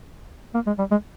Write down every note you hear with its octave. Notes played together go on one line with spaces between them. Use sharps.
A#3
G#3
G3
G#3